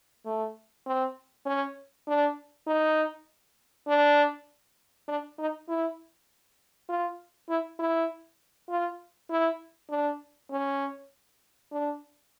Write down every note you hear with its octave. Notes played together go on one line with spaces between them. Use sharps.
A3
C4
C#4
D4
D#4
D4
D4
D#4
E4
F4
E4
E4
F4
E4
D4
C#4
D4